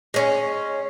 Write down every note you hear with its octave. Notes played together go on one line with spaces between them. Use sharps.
G#3 C#4